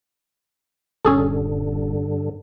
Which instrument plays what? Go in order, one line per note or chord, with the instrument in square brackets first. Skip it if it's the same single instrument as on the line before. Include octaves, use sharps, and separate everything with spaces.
[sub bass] D#1 [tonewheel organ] G2 D3 [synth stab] C#4 G#4 A4